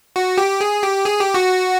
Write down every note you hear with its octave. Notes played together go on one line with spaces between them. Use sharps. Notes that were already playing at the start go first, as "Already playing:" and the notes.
F#4
G4
G#4
G4
G#4
G4
F#4